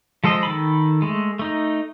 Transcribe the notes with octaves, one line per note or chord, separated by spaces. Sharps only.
F3 G#3 A4 C5 D#5
D#3 A4 B5
G#3 A3
A3 D#4